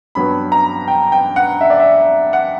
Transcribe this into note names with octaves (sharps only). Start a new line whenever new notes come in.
G2 F#3 B3 B5
A#5
G5
G5
F#5
E5
D5
E5
F#5